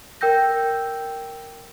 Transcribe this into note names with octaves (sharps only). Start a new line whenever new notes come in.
A#4 G5 E6 G6 A#6